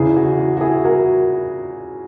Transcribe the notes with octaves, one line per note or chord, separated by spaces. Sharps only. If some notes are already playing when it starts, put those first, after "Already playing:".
Already playing: E2 C#3 E3 E4 G#4
F#4
F#4
F#4
E4 G#4
F#4 A#4